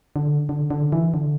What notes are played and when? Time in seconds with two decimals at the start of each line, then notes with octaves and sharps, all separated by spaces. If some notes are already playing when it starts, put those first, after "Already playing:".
0.16 D3
0.49 D3
0.71 D3
0.92 E3
1.14 D3